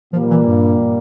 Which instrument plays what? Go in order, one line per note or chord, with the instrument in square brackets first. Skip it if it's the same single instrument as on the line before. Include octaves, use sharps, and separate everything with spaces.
[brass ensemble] A#2 G3 A#3 [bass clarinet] F3
[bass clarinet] E3
G2